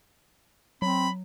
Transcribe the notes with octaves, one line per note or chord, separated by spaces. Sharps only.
F#3 C4 B5